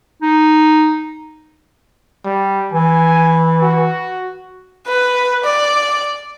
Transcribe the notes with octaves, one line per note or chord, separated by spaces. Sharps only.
D#4
G3
E3 G#5
F#4
B4
D5